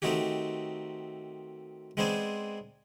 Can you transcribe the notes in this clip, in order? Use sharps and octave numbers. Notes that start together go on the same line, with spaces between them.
D#3 A3 C4 D#4 F#4 G4
G#3 B3 C4 D4 C5 G#5